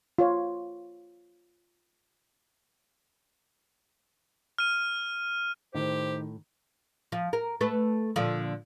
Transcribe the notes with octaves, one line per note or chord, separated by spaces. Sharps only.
F4 C#5
F6 D#7
A2 D#3 G4 C5
F3
A#4
A3 A4 B4
A#2 D3 F3